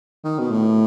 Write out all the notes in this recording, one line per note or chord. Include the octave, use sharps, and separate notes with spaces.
D#3
B2
A2